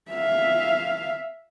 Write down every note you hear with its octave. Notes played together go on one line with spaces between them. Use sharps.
E5 F5